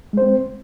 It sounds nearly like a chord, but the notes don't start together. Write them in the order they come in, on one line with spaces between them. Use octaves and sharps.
G#3 C5 C4